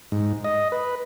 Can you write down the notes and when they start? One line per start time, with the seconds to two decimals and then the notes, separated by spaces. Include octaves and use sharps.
0.12 G#2
0.44 D#5
0.72 B4